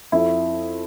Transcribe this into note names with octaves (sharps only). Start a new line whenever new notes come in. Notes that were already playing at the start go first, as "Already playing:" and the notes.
F2 E4